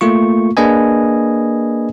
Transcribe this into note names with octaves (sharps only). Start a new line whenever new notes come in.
A3 A#3 F4 C#6
A#3 D4 G#4 B4 D#5 G#5